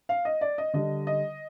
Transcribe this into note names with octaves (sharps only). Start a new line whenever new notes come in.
F5
D#5
D5
D#5
D3 G3 D#5
D#5